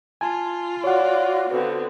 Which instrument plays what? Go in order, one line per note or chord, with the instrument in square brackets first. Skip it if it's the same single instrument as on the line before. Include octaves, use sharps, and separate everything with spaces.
[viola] F4 [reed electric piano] G#5 A5
[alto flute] F#4 [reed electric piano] C#5 F#5 [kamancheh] D5 F5
[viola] D3 [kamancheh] B3 C4